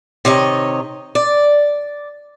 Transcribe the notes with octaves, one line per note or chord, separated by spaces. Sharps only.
C3 D#3 C#5 D#5
D5